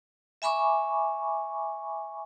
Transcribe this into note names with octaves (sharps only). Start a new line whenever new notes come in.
E5 G#5 B5 C#6 D6